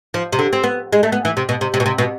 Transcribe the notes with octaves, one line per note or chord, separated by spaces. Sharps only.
F3
C3
D3
C4
B3
G#3
A3
B3
E3
C3
B2
C3
C3
B2
C3
B2